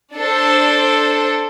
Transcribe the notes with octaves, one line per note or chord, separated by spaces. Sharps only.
D4 A4 C5